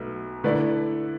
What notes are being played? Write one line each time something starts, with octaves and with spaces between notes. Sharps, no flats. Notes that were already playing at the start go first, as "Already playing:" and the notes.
Already playing: B1 B2 A3
D3 A3 E4 B4 D5